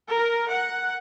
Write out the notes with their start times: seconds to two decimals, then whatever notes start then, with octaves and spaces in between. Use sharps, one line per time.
0.10 A#4
0.51 F#5